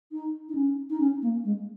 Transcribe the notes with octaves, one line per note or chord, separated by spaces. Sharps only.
D#4
D#4
C#4
D#4
C#4
A#3
G#3